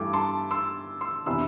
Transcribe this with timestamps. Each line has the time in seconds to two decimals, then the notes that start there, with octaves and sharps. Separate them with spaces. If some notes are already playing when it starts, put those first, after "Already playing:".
Already playing: G2 E3 A3 D6
0.13 A5 C6
0.51 C6 E6
1.01 C6 E6
1.26 C3 E3 B3 D4 C6 E6